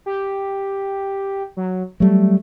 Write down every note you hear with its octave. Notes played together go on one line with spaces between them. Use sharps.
G4
F#3
F#3 G3 A3